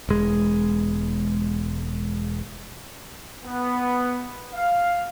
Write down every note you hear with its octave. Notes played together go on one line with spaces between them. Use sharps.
E1 G#3
B3
F5